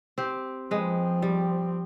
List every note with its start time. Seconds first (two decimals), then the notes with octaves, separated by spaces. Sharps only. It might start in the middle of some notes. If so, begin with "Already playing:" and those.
0.18 C4 G4
0.71 F3 G#3 C4 B4
1.22 G3